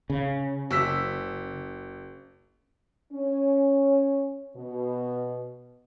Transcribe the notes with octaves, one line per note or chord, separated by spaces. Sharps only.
C#3
F#1 E6 B6
C#4
B2